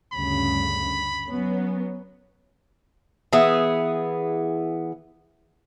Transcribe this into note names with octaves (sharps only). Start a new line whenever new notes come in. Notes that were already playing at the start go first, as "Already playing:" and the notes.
D2 G2 C#3 B5
F#3 B3 C#4
E3 B3 G#4